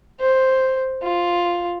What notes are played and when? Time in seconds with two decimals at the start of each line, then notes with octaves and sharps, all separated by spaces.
0.20 C5
1.03 F4